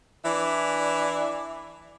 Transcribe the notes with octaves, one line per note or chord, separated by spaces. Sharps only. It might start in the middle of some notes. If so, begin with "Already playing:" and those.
E3 D4 E5